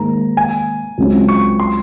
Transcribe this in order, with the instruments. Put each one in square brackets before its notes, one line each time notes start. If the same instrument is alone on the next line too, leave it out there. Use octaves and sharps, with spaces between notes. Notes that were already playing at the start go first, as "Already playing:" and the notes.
Already playing: [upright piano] G#2 D#3 A#3 [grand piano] A#5
[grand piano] G#5
[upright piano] C#2 C#3 F#3 C4
[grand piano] C#6
C6